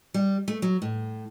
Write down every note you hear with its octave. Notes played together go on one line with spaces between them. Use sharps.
G3
A3
F#3
A2